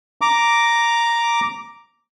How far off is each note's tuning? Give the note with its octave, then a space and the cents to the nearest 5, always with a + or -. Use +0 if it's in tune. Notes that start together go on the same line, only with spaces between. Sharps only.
A#5 +0 D6 -5